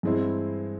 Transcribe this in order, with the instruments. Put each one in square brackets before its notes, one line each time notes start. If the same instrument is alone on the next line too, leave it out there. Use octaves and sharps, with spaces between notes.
[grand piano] G2 E3 G#3 C4 E4